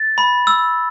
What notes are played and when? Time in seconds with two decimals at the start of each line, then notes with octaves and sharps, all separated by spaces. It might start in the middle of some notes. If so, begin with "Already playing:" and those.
Already playing: A6
0.18 B5
0.47 E6